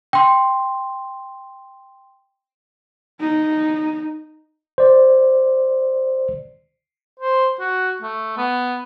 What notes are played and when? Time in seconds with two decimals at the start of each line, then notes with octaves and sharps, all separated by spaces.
0.13 G5 C6
3.21 D#4
4.78 C5 D5
7.19 C5
7.60 F#4
8.02 A3
8.37 B3